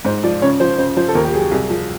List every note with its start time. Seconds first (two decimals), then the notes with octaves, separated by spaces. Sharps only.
0.05 G#2 C5
0.23 F3 D5
0.42 C#3 C#5
0.60 F3 C5
0.78 C#3 C5
0.97 F3 C5
1.08 A4
1.15 D#2 A#4
1.24 G4
1.34 F#3 G#4
1.51 C2 G#4
1.70 F3